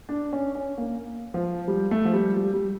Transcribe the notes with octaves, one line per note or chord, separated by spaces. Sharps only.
D4
C#4
C#4
A#3
F3
G3
A3
F3
G3
G3
G3